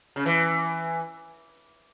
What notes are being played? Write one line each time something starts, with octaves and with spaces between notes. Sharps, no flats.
C#3
E3